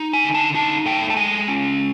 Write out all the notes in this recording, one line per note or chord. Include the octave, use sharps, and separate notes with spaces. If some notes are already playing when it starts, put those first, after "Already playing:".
Already playing: D#4
G#5
D3
A5
D#4 A5
A3 G5
A5
G#3 G#5
C#4